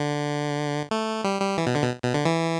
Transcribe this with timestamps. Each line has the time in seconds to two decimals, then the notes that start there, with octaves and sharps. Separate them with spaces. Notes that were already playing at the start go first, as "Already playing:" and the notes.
Already playing: D3
0.91 A3
1.24 G3
1.41 G3
1.58 E3
1.67 B2
1.75 D3
1.83 B2
2.03 B2
2.14 D3
2.25 E3